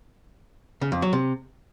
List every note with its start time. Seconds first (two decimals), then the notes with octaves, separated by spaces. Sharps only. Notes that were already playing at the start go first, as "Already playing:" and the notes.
0.81 C#3
0.92 F2
1.02 F#3
1.13 C3